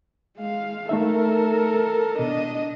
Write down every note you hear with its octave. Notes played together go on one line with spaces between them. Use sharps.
G#3 F5
A3 D#4 A4 A#4 E5
B2 D4 D#5